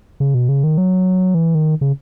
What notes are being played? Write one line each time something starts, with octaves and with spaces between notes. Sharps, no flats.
C#3
B2
C#3
D#3
F#3
E3
D#3
C#3